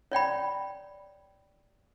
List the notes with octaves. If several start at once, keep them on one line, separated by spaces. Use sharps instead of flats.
C#5 D5 G5 B5